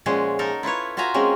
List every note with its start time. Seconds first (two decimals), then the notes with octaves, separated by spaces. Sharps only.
0.06 A#2 F3 G#3 C#4 G#4 F#5
0.39 D#4 A4 A#4
0.63 E4 F4 B4 C#5
0.97 F4 F#4 E5 G#5 A#5
1.14 G#3 A#3 C4 C#4